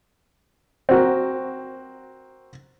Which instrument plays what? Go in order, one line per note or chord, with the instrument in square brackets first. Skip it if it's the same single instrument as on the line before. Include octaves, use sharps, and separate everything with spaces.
[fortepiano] C4 F#4 A#4